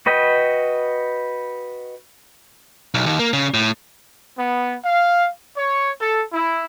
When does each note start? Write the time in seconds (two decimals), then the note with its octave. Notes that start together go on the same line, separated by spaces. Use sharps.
0.06 F#4 B4 D#5 G5
2.94 B1
3.06 D#2
3.19 A#3
3.33 C#3
3.54 A2
4.37 B3
4.83 F5
5.55 C#5
5.99 A4
6.32 E4